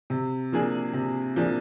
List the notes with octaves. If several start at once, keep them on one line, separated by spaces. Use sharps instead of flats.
C3
F3 A#3 D4 G#4
C3
F3 A#3 D4 G#4